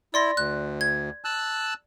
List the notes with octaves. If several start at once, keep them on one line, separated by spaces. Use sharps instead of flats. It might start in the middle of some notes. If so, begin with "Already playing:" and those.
E4 D5 C6 A#6
D2 F#6
G#6
A5 E6 F#6